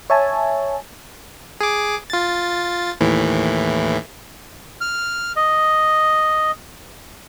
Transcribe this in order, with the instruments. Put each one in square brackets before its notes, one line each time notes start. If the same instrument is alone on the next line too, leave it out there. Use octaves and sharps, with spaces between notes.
[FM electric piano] C#5 E5 G#5 A5
[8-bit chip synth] G#4 D6
F4 A6
D#2 A2 E3
[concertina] F6
D#5